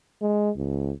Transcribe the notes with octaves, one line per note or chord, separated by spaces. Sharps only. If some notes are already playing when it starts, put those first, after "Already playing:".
G#3
C#2